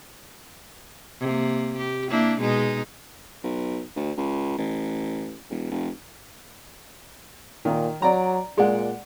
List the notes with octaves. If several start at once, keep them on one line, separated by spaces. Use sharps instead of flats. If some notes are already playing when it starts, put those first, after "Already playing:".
C3 A#3
G4
A#3 D4 E4
B2 G#3 D#4
B1
D2
C#2
A1
E1
F1
A#2 D#3
F#3 D5 A#5
A#2 G#3 D5 F#5